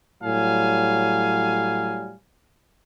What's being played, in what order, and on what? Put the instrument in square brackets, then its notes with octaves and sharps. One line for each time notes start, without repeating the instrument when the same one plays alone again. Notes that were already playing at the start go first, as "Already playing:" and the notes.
[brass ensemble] A2 F#3 G3 F5 G#5